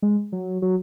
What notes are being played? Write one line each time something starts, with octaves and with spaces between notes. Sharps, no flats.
G#3
F#3
F#3